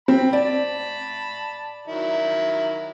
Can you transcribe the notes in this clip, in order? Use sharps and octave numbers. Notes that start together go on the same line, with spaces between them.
C4 B5
D5 A5 B5
D#3 F#3 E4